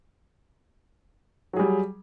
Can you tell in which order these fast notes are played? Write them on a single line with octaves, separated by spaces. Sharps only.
F#3 G#4 G3